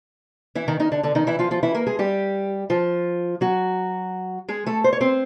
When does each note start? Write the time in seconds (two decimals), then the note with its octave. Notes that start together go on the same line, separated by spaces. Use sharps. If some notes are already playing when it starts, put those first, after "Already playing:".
0.55 E3 E4
0.68 D#3 D#4
0.80 D#3 D#4
0.92 D3 D4
1.03 D3 D4
1.15 D#3 D#4
1.27 E3 E4
1.39 F3 F4
1.51 F3 F4
1.63 E3 E4
1.75 A#3 A#4
1.87 G#3 G#4
1.99 G3 G4
2.70 F3 F4
3.41 F#3 F#4
4.49 G#3 G#4
4.67 A3 A4
4.84 C5
4.93 C#5
5.01 C4 C5